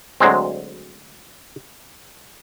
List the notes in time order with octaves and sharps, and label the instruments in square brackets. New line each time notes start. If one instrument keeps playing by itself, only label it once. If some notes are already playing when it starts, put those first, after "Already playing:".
[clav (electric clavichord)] D2 F#3 G#3 C4